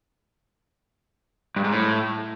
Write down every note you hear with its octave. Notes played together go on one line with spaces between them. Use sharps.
G2
G#2
A2